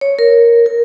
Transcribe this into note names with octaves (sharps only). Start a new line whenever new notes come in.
C#5
A#4
A#4